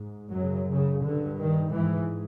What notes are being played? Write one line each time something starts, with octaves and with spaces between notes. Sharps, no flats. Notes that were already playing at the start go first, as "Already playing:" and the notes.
Already playing: G#2
F#2 C#3 F#3
C#3
G2 D3
D#3
G#2 E3